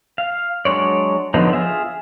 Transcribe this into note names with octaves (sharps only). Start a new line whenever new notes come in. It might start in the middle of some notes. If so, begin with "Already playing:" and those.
F5
F#3 G#3 D4 C#5 D5
D3 F3 F#3 B3 D#4
F4 G#4 E5